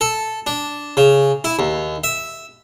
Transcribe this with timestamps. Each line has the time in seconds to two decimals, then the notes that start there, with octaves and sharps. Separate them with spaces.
0.01 A4
0.47 D4
0.97 C#3
1.44 E4
1.59 D#2
2.04 E5